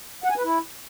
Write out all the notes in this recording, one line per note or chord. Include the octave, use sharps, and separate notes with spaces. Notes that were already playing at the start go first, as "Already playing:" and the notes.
F#5
G#5
B4
E4